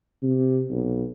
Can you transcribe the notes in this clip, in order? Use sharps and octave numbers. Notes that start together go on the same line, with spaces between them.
C3
B1